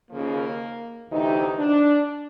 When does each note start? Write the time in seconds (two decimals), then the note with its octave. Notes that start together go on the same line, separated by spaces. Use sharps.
0.10 D#2 C#3 F3 A#3
1.10 D2 C3 E3 D#4
1.59 D4